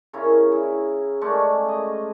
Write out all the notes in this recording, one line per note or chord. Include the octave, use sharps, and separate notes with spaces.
C#3 C#4 E4 A#4
E4
G#3 A3 C#4 D5
D#5